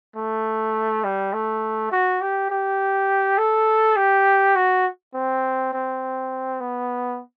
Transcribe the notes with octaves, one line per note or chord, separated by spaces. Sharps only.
A3
G3
A3
F#4
G4
G4
A4
G4
F#4
C4
C4
B3